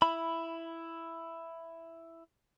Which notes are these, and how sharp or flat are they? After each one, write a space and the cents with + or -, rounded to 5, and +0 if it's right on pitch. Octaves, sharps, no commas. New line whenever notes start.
E4 +5 B5 +0